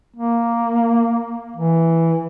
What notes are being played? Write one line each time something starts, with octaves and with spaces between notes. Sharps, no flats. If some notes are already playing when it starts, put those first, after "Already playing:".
A#3
E3